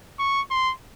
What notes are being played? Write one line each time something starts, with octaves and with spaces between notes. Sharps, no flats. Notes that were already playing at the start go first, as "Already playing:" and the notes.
C#6
C6